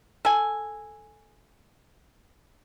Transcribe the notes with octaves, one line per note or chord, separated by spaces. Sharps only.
A4 G#5